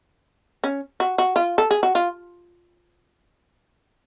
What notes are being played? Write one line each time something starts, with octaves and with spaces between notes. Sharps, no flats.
C#4
F#4
F#4
F4
A4
G#4
F#4
F4